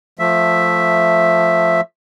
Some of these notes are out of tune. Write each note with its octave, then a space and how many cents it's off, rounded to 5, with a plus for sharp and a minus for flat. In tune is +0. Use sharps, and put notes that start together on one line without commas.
F3 +5 A3 +0 E5 +0